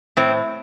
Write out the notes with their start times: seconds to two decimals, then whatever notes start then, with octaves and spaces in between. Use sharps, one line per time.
0.17 A2 C4